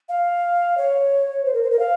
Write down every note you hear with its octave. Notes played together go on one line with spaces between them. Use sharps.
F5
C#5
C5
A#4
C5
A#4
F5